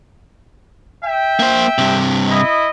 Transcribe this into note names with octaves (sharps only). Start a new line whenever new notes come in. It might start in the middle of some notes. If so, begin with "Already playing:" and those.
E5 G5
A#3 C5
G2 C3
E4 D#5